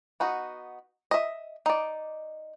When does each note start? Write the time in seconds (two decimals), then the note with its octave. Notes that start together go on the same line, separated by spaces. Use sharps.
0.20 B3 D#4 F#4
1.11 D#5 E5
1.66 D#4 D5